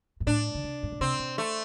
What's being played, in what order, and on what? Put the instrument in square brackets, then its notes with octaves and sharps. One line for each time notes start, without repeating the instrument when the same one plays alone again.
[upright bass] G2
[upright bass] A2 [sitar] D4
[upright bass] D3
C3
G2
A2
[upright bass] C3 [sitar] C4
[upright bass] C3
[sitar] A3